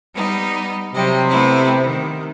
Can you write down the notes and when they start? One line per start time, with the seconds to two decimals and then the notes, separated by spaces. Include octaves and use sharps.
0.14 G3 B3 D#4
0.94 C3 F#3 G3 D#5
1.30 A3 B3 E4
1.82 D#3